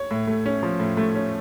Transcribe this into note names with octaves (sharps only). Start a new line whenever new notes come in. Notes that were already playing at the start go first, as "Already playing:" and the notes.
Already playing: C#5
A2
A3
C#4
F3
A2
A3
C#4